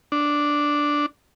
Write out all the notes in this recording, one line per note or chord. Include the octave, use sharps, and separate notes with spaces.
D4